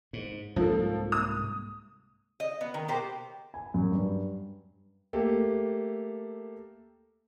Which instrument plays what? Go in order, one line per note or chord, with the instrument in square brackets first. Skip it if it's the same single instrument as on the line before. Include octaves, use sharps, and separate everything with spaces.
[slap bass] G#2
[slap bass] C2 G#2 A#3 [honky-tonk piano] F3 A4
[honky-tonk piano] D#6
[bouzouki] D#5
B3
D#3
B2 A#3 G4 C5
[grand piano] G#5
F#2
G2
A3 A#3 G4 A4